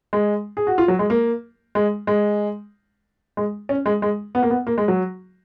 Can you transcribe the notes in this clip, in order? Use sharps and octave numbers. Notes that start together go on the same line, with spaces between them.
G#3
G#4
F#4
F4
F#3
G#3
A#3
G#3
G#3
G#3
C#4
G#3
G#3
B3
A#3
B3
A#3
G#3
F#3